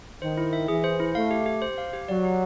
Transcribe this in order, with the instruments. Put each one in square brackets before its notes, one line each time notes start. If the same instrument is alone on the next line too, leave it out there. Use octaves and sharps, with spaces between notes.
[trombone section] D#3 [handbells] C5
[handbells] E4
E5
[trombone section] E3 [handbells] G#4
[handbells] C5
E4
[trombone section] A3 [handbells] F5
[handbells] G4
G4
C5
F5
G4
[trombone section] F#3 [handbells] D5
[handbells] G4